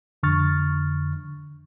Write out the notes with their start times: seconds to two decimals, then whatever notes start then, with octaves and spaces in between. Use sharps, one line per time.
0.23 F2 D3 C#6 F6 A6